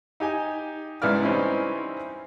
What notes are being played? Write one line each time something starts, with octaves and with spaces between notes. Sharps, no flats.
D#4 G4 G#5
C#2 G#2 B3 E4 D5 F6
E3 G3 C4 C#4 D#4 E4